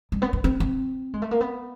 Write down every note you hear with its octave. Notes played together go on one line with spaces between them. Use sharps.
G3
B3
D4
C4
C4
G#3
A3
A#3
B3